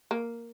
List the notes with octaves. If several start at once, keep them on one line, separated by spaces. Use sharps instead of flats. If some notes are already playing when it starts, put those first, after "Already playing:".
A#3